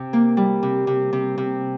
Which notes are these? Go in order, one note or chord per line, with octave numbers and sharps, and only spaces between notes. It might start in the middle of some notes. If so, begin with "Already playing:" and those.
Already playing: C3
A#3
G3
C3
C3
C3
C3